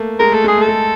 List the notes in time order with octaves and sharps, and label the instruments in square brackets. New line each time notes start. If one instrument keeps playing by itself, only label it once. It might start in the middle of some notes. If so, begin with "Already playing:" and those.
Already playing: [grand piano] A3 A#3
[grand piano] G#3 [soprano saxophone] A#4
[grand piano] A3 [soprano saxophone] A4
[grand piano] G#3 [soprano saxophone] G#4
[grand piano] A3
[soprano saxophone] A4
[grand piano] G#3